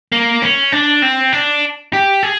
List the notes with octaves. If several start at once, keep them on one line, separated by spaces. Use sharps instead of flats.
A#3
C#4
D4
C4
D4
G4
G#4